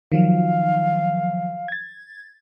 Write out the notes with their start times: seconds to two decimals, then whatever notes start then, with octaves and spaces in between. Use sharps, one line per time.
0.12 D#3 F3 F#3 F5
1.68 G#6 A6